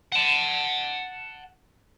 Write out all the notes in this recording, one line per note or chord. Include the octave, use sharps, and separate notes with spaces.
F#5 A5